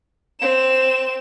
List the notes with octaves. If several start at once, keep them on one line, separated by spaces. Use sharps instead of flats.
C4 E7